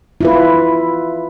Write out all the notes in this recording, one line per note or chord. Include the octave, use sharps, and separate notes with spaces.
E4 F4 B4